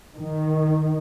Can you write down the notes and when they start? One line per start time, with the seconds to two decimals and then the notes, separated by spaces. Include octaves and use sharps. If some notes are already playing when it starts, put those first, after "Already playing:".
0.15 D#3